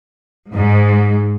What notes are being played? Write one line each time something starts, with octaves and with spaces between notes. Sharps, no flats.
G#2